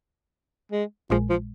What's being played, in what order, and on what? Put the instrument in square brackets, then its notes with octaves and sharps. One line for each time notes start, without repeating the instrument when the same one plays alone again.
[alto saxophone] G#3
[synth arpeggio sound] A#1 A#2 G#3 [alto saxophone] F3
[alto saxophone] F3